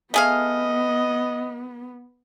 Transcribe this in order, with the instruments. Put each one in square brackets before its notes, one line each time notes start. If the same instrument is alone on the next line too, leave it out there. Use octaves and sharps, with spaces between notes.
[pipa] A3 G#4 F5 [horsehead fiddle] B3 [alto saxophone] D#5